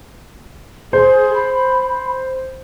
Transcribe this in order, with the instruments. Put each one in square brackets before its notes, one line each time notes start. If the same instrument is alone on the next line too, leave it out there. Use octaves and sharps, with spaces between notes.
[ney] G#4 [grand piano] C5
[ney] B5